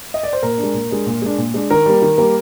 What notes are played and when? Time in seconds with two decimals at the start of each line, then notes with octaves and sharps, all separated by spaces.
0.14 D#5
0.23 D5
0.33 C5
0.43 A#2 A#4
0.58 G#3 D4
0.74 A#2
0.91 G#3 D4
1.06 A#2
1.22 G#3 D4
1.38 A#2
1.54 G#3 D4
1.70 D#3 A#4
1.86 G3 A#3
2.02 D#3
2.18 G3 A#3